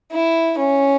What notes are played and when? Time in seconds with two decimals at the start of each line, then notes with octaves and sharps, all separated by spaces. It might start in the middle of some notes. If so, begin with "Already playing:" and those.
0.12 E4
0.58 C#4